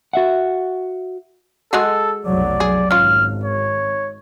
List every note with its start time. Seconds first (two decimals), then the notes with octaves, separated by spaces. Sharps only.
0.13 F#4 E5 F#5
1.73 G#3 F#4 G#4 A4
2.25 F1 B1 F#3 D5
2.60 G#4
2.91 G#1 C#4 F4 F6
3.43 C#5